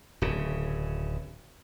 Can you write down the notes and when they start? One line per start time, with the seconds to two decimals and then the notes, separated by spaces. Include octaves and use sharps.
0.22 D1 C#3